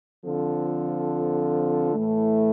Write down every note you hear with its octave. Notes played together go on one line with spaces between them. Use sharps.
D3 F3 C4 F4 A4
A2 E3 A3